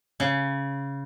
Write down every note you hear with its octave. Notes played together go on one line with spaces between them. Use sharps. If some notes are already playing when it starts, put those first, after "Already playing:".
C#3